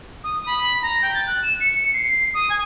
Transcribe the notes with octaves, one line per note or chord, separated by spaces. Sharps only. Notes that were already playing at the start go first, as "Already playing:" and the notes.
D#6
B5
A#5
G5
A6
F#6
E7
C#7
C7
D#6
G#5